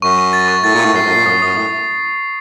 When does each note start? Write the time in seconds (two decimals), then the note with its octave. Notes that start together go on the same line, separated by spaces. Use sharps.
0.02 F#2 C#6
0.18 C#6
0.33 A6
0.48 C#6
0.64 A2 A6
0.75 A#2
0.80 A2 C#6
0.95 F#2 C7
1.01 A2
1.06 F#2
1.11 A#2 C7
1.26 F#2 D#6
1.42 F#2 D#6
1.57 A2 D#6